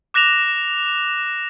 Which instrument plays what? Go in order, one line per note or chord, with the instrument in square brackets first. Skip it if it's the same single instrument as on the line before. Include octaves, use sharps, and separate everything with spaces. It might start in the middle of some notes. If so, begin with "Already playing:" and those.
[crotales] D6 F#6 A#6 E7 F7